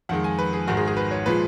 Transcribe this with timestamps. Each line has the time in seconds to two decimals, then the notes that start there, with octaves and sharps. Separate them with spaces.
0.09 F2 D#3 G#3 F#5
0.24 G#5
0.39 B4
0.53 G#4
0.67 G#1 G#2 D#3 G#3 F#4
0.77 G#4
0.87 G#4
0.97 B4
1.11 C#5
1.26 A#2 F3 G#3 B4